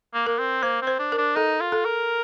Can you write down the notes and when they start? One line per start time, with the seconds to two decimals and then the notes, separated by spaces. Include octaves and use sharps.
0.14 A#3
0.27 A#3 A#4
0.39 C4
0.63 A#3 C5
0.82 C4
0.87 C5
0.99 D4
1.12 A#4
1.18 D4
1.35 D#4 A4
1.61 F4
1.72 A4
1.85 A#4